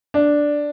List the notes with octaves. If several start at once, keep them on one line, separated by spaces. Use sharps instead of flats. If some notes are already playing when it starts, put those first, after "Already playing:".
D4